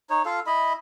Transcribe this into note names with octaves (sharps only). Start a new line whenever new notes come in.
D#4 C#5
F4 A4 F5
E4 D#5 B5